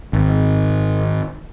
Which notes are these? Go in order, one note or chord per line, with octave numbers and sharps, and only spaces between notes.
G#1